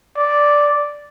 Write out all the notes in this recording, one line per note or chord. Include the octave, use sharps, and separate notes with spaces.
D5